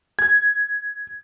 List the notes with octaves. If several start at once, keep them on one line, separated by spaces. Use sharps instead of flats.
G#6